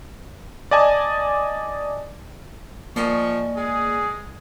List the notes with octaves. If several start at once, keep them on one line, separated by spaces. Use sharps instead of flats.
D5 D#5 G#5 A5
F3 A#3 D5 D#5 G#5 C#6
G#3 G#4